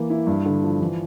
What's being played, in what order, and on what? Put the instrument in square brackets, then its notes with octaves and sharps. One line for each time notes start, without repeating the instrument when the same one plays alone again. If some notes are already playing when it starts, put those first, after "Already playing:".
Already playing: [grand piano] E3 A#3
E4
G2
D3
F3
E3